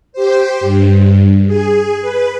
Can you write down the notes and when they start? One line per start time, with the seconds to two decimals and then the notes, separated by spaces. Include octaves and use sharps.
0.13 G4 C5
0.61 G2
1.47 G#4
2.01 B4